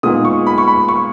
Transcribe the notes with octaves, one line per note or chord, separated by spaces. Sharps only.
A#2 G#3 B3 D#4 D#6
C#6
B5
C#6
B5
C#6